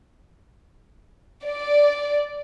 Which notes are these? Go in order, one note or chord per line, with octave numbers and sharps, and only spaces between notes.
D5